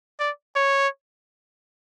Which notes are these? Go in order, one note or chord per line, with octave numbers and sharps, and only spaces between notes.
D5
C#5